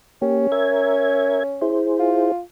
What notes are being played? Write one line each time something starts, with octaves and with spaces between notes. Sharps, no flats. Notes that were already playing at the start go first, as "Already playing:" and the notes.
A#3 C#4 G4
A#4 E5 G#6
E4 G#4 C5
F4